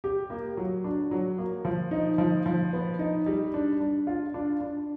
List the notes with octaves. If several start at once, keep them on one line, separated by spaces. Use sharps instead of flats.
G4
A#3
F#3
D4
F#3
A#3
F3
D#4
F3
F3
B3
D#4
G3
D4
D4
F4
D4
D4